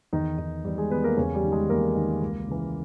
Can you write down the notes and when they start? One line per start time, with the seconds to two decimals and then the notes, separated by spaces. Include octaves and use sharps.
0.13 E2 D#3 D#4
0.38 D#3
0.64 E2 G3 G4
0.78 G#3 G#4
0.90 D#3 B3 B4
1.04 A#3 A#4
1.17 E2 C#3 C#4
1.35 G3 G4
1.43 D#3
1.52 G#3 G#4
1.69 E2 A#3 A#4
1.95 D#3
2.22 C#2
2.48 C#3 E3